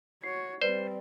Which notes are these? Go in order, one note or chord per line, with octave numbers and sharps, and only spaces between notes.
F#4 C#5 C7
G3 C4 B4 C5 D5